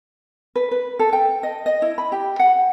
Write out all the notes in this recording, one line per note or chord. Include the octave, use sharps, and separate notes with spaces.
B4
B4
A4
G5
D#5
D#5
E4
B5
G4
F#5